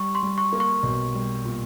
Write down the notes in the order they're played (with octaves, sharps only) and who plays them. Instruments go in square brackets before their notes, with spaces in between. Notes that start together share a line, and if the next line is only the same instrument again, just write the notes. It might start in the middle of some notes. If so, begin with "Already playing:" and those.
Already playing: [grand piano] G3 [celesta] C#6
[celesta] C6
[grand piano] G3
[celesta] C#6
[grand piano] A#3
[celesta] C#6
[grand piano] B1
G3
A#2